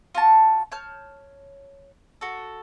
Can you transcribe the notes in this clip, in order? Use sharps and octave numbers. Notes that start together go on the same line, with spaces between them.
F4 F#4 A5
C#5 A5 F6 G6
F#4 A4